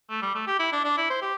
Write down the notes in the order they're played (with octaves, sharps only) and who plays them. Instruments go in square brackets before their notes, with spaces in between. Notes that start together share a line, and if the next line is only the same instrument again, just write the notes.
[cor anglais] A3
G3
A3
G4
E4
D4
D4
E4
C5
G4